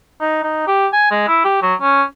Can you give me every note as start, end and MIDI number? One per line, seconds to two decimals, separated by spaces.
0.20 0.40 63
0.43 0.63 63
0.67 0.87 67
0.93 1.10 80
1.11 1.24 56
1.27 1.40 64
1.44 1.59 67
1.62 1.74 54
1.81 2.02 61